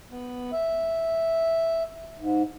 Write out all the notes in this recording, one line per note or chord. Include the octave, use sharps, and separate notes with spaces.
B3
E5
G#2